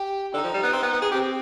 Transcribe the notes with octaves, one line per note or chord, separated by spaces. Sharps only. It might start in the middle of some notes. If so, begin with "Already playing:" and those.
Already playing: G4
D3 D#4
F3
G3
B3
C4
B3
B3
G#4
C4 G4